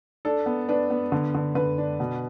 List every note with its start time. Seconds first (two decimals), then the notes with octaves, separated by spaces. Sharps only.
0.25 D4 A4
0.46 B3
0.69 D4 B4
0.90 B3
1.12 D3
1.35 D3
1.55 D3 B4
1.78 D4
2.00 B2